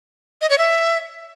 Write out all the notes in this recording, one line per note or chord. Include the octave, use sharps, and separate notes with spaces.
D#5
C#5
E5